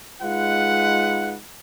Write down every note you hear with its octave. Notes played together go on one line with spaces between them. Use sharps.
G#3 D#4 F4 B4 F#5